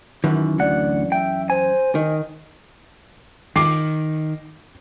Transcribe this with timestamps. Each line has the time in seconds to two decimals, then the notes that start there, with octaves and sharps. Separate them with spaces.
0.24 F#2 D#3 E3
0.59 D2 D5 F#5
1.12 E5 G5
1.50 C5 G#5
1.95 D#3 D#5
3.56 D#3 D6 C7